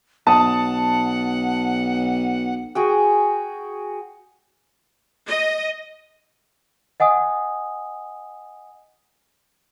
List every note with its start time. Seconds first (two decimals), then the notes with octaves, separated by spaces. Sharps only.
0.27 B1 F#5 A5 D#6
2.75 F#4 G#4 G5
5.26 D#5
7.00 D#5 F#5 G#5 D#6